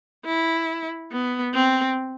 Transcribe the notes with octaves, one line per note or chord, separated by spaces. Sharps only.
E4
B3
C4